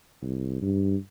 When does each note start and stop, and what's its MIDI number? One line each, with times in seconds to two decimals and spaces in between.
0.22 0.59 36
0.61 0.96 43